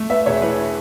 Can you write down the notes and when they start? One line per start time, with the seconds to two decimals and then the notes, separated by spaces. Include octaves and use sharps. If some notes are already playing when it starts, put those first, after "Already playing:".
Already playing: A3
0.10 B3 E5
0.26 E1 C#5
0.42 E3 B4